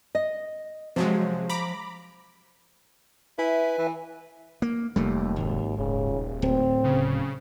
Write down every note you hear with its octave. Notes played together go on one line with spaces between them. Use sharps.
D#5
C3 F3 F#3 G#3
A#5 B5 D6
E4 B4 E5 G#5
E3
A#3
F1 D#2 G3 A3 A#3
G#1
D#1 C#3
D1 C4
C#3